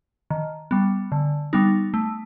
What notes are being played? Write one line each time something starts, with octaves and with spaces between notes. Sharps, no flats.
D#3
G3 B3
D3
G3 B3 D#4
A3